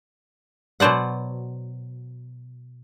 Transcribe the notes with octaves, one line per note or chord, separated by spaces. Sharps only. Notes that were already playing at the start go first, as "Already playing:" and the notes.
B2 F#3 C5 D5 F#5